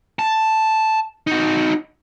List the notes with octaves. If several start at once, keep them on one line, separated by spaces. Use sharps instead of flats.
A5
D#4 F#4